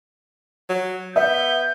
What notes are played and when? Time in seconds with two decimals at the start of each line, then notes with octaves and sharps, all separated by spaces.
0.69 F#3
1.16 B3 E5 G6